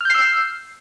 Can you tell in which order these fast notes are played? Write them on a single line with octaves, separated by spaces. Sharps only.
F6 G6 C7 E6